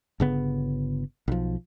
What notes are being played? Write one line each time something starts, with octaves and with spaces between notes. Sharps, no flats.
G1 C#3 B3
B1 F3